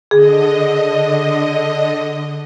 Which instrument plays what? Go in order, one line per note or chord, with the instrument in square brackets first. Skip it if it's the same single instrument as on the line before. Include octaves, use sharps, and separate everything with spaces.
[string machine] D3 D#5 [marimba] G#4